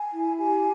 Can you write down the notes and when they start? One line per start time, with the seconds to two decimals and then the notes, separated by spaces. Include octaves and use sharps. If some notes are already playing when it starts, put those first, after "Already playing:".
Already playing: G#5
0.14 E4
0.38 G4 G#5